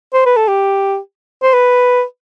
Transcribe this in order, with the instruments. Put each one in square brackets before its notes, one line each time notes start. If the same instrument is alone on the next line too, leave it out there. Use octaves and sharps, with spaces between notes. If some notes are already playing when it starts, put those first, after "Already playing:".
[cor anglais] C5
B4
A4
G4
C5
B4